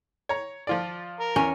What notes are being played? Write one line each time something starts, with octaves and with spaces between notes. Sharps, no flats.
C#5 A#5
F3 F4 D5
A#4
E2 C#4